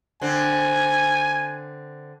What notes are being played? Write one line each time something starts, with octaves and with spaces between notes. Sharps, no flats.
D3 C4 G#5